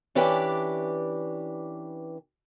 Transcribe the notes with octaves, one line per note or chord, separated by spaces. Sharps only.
E3 C#4 D4 G4 B4 D5